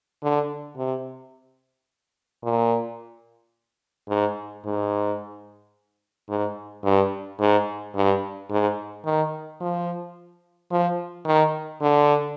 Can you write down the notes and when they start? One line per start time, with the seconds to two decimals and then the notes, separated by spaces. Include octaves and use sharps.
0.23 D3
0.77 C3
2.44 A#2
4.09 G#2
4.64 G#2
6.29 G#2
6.84 G2
7.40 G#2
7.95 G2
8.50 G#2
9.05 D#3
9.60 F3
10.71 F3
11.26 D#3
11.81 D3